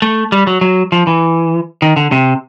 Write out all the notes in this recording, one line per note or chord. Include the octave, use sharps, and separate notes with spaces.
A3
G3
F#3
F#3
F3
E3
D#3
D3
C3